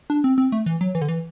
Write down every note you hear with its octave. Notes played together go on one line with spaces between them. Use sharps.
D4
C4
C4
A3
E3
F#3
E3
D3
E3